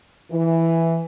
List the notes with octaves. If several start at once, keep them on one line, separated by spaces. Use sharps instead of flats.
E3